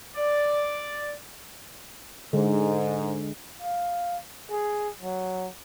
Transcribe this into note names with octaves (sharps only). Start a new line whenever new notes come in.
D5
G#2 D3 G#3
F5
G#4
F#3